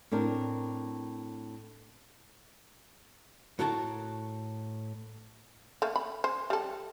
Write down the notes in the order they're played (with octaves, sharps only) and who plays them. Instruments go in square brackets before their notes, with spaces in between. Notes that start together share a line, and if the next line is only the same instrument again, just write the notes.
[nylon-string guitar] A2 C4 D4 A#4
[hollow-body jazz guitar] A2 F#4 A4 A#4 F#5 A5
[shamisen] A3 A#3
B5
C5
G3 A4